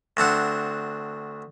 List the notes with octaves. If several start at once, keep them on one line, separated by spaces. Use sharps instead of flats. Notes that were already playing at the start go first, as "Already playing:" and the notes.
D2 C4 D4 F#5